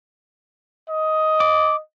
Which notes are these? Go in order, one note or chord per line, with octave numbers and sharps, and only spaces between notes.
D#5
D6